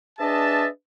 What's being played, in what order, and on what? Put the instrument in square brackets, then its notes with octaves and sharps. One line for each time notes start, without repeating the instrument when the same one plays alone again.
[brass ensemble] D4 G#4 B4 D#5 E5 A5